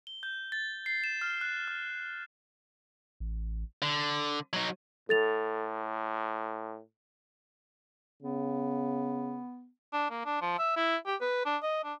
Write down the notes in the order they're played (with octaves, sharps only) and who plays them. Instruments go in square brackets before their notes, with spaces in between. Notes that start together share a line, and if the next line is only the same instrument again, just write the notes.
[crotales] G7
G6
A6
C7
E7
F6
F#6
F6
[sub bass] A1
[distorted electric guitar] D3
F#3 D#4
[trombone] A2 [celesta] A4 A6 F7
[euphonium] C#3 [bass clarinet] B3
[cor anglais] D4
A#3
D4
F3
E5
E4
G4
B4
D4
D#5
D4